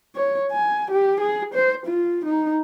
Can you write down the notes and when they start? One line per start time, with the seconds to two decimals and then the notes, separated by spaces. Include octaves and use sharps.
0.15 C#5
0.52 G#5
0.91 G4
1.20 G#4
1.54 C5
1.86 F4
2.25 D#4